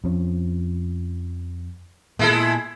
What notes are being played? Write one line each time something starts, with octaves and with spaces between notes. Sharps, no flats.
F2 F3 C#4
A#2 G#3 B3 E4 A4